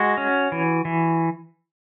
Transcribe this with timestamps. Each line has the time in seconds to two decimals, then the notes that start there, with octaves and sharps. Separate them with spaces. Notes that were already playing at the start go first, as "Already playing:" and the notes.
Already playing: G#3 F#4
0.18 C#4
0.52 E3
0.85 E3